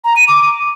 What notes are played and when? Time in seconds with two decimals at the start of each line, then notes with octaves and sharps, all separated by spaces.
0.04 A#5
0.16 D#7
0.28 D6